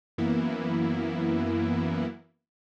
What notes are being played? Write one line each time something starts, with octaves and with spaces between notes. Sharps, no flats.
F#2 E3 A#3 B3 E4